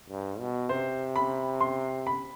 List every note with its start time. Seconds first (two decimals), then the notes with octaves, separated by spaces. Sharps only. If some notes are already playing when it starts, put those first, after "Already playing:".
0.09 G2
0.40 B2
0.69 C3 C5
1.16 B5
1.61 C6
2.07 B5